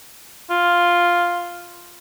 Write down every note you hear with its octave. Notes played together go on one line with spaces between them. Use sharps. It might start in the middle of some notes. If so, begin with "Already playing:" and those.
F4